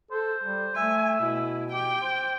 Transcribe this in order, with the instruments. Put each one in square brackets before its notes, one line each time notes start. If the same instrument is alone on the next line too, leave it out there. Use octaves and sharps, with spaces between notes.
[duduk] A4 [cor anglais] C5
[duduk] G3
[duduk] A3 [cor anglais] E5 [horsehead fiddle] G#5
[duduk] B2 [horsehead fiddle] E4
[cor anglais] G4 [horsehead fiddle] G5
[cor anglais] C5